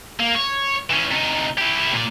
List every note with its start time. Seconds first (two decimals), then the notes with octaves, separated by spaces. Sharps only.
0.20 A#3
0.35 C#5
0.90 E3 C#4
1.11 C3 D#4
1.58 E4 G4
1.93 A#2 D5